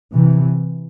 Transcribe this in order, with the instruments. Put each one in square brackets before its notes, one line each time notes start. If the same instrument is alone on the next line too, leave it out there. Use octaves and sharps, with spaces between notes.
[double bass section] C3 E3